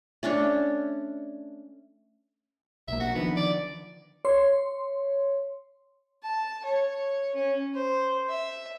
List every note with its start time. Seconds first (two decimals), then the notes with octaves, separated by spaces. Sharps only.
0.23 A3 C#4 D4 C#5
2.88 B1 A#3 E5
3.00 F#4
3.15 D3 D#3 F3 B3
3.37 D5
4.25 C#5 C6
6.23 A5
6.65 C#5
7.35 C#4
7.74 C5
8.29 E5